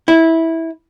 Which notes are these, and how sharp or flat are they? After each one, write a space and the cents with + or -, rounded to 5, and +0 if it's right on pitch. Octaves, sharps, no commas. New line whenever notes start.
E4 -15